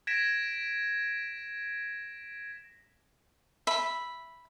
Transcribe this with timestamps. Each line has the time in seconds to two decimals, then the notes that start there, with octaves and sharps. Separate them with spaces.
0.07 G#6 A#6 B6 D7 E7
3.67 E5 B5